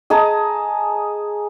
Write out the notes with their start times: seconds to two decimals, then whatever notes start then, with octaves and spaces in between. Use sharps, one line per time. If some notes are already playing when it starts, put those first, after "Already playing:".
0.10 G#4 D#5 A5 A#5